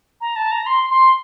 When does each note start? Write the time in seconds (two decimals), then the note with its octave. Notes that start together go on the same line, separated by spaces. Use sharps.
0.21 A#5
0.36 A5
0.52 A#5
0.66 C6
0.90 C6